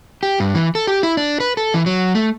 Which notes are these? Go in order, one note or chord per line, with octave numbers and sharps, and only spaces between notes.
G4
G2
E3
A4
G4
E4
D4
B4
A4
E3
F#3
A3